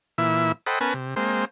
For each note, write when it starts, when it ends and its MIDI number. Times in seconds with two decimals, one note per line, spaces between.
0.18 0.52 46
0.18 0.52 52
0.18 0.52 64
0.18 0.52 76
0.67 0.79 69
0.67 0.79 72
0.67 0.79 75
0.67 0.79 78
0.67 0.79 79
0.67 0.79 83
0.81 0.94 59
0.81 0.94 61
0.81 0.94 70
0.81 0.94 71
0.81 0.94 80
0.81 0.94 81
0.94 1.15 48
1.16 1.45 56
1.16 1.45 58
1.16 1.45 60
1.16 1.45 72